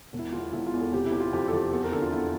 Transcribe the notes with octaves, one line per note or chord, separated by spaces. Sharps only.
E1
E4
E2 F4
E1 E4
F4
E2
A4
C3 G4
E4
C3 G4
F4
F2 G4
A4
F2 G4
E2 A4
A#4
D3 A4
F4
E2 E4